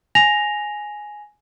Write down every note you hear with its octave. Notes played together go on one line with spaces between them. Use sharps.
G#5 A#6 F7